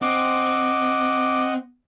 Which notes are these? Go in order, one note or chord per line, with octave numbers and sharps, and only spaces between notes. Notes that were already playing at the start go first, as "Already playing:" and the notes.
C4 D#5 F#5 D6